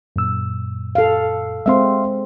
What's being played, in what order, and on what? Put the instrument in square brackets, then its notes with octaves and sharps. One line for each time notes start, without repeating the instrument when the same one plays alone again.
[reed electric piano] F#2 A#2 E6
[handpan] A4 F5
[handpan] G#3 C4 [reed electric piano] E5 F5 C6